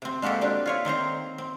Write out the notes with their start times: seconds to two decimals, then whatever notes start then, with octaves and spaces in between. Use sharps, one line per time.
0.02 C3 C4
0.22 G#3 A#3 F#4 G4 A4
0.41 G3 C4 D4
0.66 F4 C#5 E5
0.85 D#3 C4 C5 A#5
1.38 C4